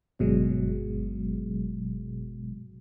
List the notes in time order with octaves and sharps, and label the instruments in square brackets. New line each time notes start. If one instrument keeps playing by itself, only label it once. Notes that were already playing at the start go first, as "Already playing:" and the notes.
[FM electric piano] G1 B2 F#3 G#3